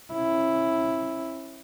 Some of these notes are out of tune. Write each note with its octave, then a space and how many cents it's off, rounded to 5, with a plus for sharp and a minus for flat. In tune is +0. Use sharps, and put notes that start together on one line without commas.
C#4 -40 E4 +0